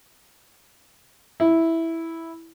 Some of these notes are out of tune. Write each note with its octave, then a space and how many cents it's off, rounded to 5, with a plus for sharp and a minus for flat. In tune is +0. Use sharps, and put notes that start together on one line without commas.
E4 -5